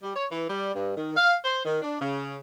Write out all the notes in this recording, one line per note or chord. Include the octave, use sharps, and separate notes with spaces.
G3
C#5
E3
G3
G2
D#3
F5
C5
D#3
D4
C#3